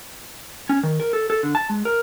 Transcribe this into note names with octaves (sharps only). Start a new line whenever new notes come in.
C#4
D#3
A#4
A4
A4
D3
A5
G#3
A#4